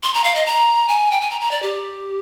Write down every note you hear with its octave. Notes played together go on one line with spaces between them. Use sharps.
C6
A#5
F5
D#5
A#5
G#5
G5
G#5
A#5
A#5
D5
G4